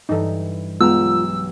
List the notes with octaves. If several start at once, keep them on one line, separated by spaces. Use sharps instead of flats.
G2 E3 D#4 A4
B1 G#3 B3 F4 G4 A#5 E6